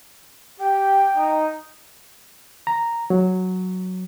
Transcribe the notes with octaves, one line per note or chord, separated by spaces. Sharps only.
G4 G5
D#4
A#5
F#3